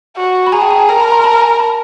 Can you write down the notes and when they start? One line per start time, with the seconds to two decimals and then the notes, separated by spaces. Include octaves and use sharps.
0.17 F#4
0.47 B5
0.52 G#4 G#5 A#5
0.61 G5 A5
0.70 G#5 A#5
0.79 G5 A5
0.89 A#4 G#5 A#5
1.00 A5 B5
1.11 A#5 C6
1.24 A5 B5
1.41 G#5 A#5
1.59 A5 B5